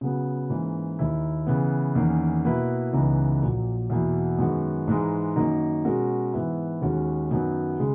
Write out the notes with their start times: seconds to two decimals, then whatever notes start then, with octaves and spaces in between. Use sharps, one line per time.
0.01 C#3 F#3 B3
0.50 G#2 E3 A#3 C#4
0.99 D#2 D#3 A#3 E4
1.47 C#3 E3 B3
1.95 E2 D#3 A#3 C#4
2.45 B2 A#3 E4 B4
2.93 C#2 C#3 E3 B3 D#4
3.41 A#1 A#2 F#3 A#3
3.90 E2 B2 A#3 E4
4.39 F#2 D#3 G#3 B3 F#4
4.88 G#2 E3 G#3 D#4
5.36 F#2 D#3 A#3 D#4 F#4
5.85 B2 G#3 C#4 F#4 A#4
6.33 G#2 E3 B3 E4
6.82 D#2 D#3 G#3 C#4 F#4
7.31 F#2 D#3 F#3 B3
7.79 C#3 G#3